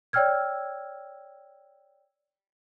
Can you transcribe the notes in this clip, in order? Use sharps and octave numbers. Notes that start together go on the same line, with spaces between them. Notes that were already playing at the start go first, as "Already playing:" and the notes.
C#5 D5 G5 E6 F6 G#6